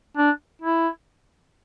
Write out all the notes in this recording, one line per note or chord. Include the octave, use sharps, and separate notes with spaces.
D4
E4